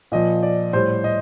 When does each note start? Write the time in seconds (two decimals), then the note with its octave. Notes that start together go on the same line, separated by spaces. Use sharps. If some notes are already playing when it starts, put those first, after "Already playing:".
0.12 A#2 F3 D#5
0.43 D5
0.73 A2 G3 C5
1.04 D#5